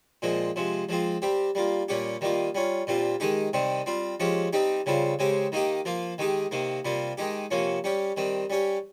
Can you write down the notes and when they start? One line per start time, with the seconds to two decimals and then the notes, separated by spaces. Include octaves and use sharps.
0.22 A#2 F3 G#3 C4
0.56 C3 F3 G#3
0.89 F3 G#3 C4 F4
1.22 G3 C4 G4
1.55 G3 A#3 F4
1.89 A#2 G3 C#4 G4
2.21 D#3 G3 A#3 F4
2.55 G3 C#4 F4
2.87 A#2 G3 C4 F4
3.20 D#3 G#3 D#4 G4
3.53 C3 D#3 G3 C4
3.86 G3 C4 F4
4.20 F3 G#3 C#4 G4
4.53 G3 C4 D#4 G4
4.86 C#3 G3 C4 F4
5.19 C#3 G#3 C4 G4
5.52 D#3 A#3 D#4 G4
5.85 F3 A#3 F4
6.18 D#3 G#3 D#4 G4
6.51 C3 D#3 A#3
6.85 C3 G3 A#3 F4
7.17 D#3 G#3 D#4 G4
7.51 C3 F3 A#3 C#4
7.84 G3 C#4 G4
8.17 D#3 G3 C4
8.50 G3 C#4 G4